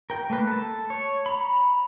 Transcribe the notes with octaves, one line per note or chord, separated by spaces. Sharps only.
A#4 G5
A3 A#3 B4
A4 A5
C#5
A#5 B5